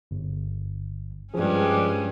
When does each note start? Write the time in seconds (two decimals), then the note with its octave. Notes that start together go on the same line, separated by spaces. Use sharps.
0.11 G1
1.34 G2 F3 G#3 C#4 G#4